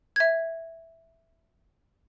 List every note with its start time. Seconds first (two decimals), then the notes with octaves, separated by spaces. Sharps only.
0.16 E5 G#6